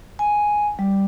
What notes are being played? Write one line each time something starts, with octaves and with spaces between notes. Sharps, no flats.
G#5
G3